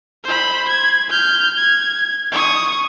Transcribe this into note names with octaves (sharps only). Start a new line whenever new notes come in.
C5 B5
G#6
F6 G6
G#6
C#6 D#6